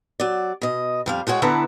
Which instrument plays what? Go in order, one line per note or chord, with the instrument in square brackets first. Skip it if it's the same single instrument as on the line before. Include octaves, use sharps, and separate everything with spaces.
[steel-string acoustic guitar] F#3 D5
B2 D#5
F2 G3 F5
A2 G#3 F#4 C#5
D3 B3 E4 A4 B4 A#5